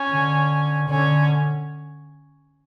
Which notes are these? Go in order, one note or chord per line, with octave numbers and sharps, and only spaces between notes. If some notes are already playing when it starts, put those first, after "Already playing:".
Already playing: C#4
D3
D3 C#4